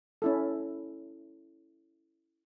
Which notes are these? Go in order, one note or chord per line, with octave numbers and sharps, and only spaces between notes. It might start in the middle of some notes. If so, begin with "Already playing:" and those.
C#4 E4 A4